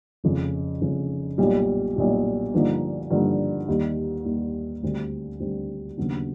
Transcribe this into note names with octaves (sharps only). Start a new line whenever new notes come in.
F1 F2 C#3
F1 F2 C#3
B1 A#2 G3
B1 A#2 G3
G2 D3 F3 A#3 D#4
G2 D3 F3 A#3 D#4
D#2 D#3 G3
D#2 D#3 G3
D2 D3 G3 C4
D2 D3 G3 C4
D#2 C#3 F#3 B3 D4